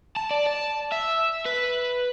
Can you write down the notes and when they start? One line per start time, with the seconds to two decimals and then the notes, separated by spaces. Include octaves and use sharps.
0.17 A5
0.31 D5
0.47 A5
0.92 E5
1.46 B4